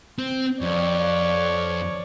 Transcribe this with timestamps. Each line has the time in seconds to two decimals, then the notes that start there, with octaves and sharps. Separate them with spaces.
0.18 C4
0.61 F2 C#5 D5